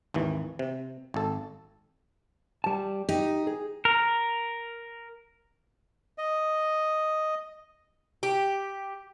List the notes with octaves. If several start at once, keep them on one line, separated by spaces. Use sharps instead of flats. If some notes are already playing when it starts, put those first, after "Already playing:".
G#1 D#2 E3
C3
G#1 A4
G3 A5
D#4 G4
G#4
A#4
D#5
G4